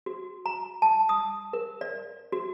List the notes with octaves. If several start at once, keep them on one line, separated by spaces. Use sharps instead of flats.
F#4
A#5
A5
D#6
A#4
D5
F#4